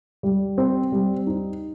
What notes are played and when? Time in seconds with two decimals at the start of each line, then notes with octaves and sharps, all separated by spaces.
0.23 G3
0.58 C4
0.92 G3
1.27 D#4